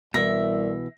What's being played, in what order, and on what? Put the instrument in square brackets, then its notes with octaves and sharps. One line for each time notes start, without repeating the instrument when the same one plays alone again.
[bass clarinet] C2 [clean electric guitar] B2 E3 [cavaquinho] E5 [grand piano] A#6